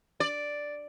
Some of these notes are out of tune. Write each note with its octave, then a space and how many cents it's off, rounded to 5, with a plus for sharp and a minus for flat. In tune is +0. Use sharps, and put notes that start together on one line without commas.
D5 +0